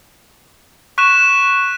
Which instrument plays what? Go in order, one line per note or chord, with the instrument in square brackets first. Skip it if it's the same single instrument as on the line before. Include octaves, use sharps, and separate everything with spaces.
[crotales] C#6 F#6 B6 E7